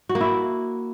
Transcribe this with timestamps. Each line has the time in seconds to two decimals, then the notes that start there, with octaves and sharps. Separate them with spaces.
0.09 F#4
0.15 A#3
0.21 E4